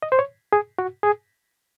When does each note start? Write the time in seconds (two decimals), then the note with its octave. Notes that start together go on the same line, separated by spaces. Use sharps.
0.03 D#5
0.12 C5
0.19 C#5
0.53 G#4
0.79 F#4
1.03 G#4